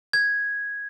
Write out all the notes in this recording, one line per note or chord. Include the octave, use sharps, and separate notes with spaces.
G#6